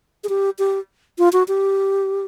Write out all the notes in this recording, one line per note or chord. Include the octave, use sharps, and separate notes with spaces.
G#4
G4
G4
F4
F#4
G4